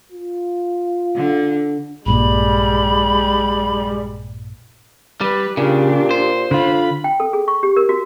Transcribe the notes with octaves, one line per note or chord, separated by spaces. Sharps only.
F4
D3
A#1 G2 A#2 G3 G#3 B5
G3 B4
A#2 C#3 D4 G4
C5
D3 F4 B5
G5
A4
G#4
C#6
G4
A#4
F#4